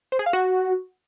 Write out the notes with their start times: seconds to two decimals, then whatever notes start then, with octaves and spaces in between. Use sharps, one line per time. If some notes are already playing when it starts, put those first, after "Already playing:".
0.12 C5
0.19 G#4
0.26 F5
0.33 F#4